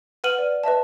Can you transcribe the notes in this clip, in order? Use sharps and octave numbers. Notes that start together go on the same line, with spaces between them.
B4 F#5 F6 D#7 F#7
D5
B4 D#5 E5 A5